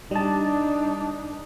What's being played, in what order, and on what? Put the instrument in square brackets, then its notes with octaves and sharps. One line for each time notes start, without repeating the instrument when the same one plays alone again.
[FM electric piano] G3 A5 [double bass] D4 D#4